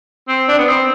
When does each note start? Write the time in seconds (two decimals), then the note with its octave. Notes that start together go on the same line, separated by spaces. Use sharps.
0.28 C4
0.48 D4
0.58 B3
0.69 C4